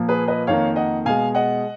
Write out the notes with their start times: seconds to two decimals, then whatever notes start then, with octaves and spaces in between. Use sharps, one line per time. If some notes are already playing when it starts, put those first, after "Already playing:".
Already playing: A#2 F3 A#3
0.08 G#4 B4
0.28 B4 D#5
0.47 F2 D#3 A#3 C#5 F5
0.76 D#5 F#5
1.05 B2 G#3 F5 G#5
1.35 D#5 F#5